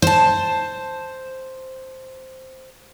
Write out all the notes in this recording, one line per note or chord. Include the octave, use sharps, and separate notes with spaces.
C5 A5